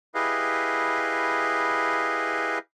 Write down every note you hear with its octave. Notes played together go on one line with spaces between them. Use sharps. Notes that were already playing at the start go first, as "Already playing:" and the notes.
E4 G4 G#4 B4 D#5 F5